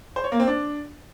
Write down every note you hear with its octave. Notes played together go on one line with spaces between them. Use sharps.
C5
C#5
A#3
C4
D4